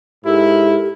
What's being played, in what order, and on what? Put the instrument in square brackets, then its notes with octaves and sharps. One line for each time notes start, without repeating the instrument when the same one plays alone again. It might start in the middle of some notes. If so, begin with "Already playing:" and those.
[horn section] G#2 E4 [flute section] G4 A4 A#4